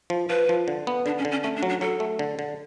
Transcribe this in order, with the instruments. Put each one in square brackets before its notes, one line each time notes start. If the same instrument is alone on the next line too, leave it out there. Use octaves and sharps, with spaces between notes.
[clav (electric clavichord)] F3
[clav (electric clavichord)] F3 [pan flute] B4
[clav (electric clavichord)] F3
D3
B3
[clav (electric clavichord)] D3 [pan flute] D4
[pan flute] C#4
[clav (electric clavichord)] D3
[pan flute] C#4
[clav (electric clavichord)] A3 [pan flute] C#4
[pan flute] D4
[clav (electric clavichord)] F#3
[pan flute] D4
[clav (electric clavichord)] F#3 [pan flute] A4
[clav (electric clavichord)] A3
D3
D3